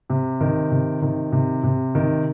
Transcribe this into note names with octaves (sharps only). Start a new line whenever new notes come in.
C3
D#3
C3
D#3
C3
C3
D#3